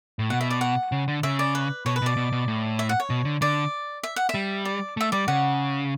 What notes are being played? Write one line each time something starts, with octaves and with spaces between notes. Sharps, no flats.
A2
B2 F#5
E5
D5
F#5
C#3
D3
C#3 E5
D5
B4
B2 C#5
B4
B2 D5
B2
B2
A2
E5
F#5
C#5
B2
D3
D3 D5
E5
F#5
E5
G3
D5
A3 E5
G3 D5
C#3 F#5